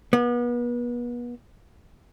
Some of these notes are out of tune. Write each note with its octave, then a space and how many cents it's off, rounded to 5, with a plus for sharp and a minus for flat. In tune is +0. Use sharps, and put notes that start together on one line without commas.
B3 -35